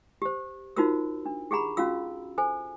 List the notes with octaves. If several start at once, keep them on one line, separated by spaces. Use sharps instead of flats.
G4 C5
D#4 F4 F#4 A#4 C5 E6
D4
G4 G#4 F#5 A#5 B5
C#4 F4 F#4 F5 E6
A4 C5 G#5